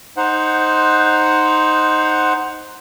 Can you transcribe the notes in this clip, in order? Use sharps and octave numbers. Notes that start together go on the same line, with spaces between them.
D#4 C5 F#5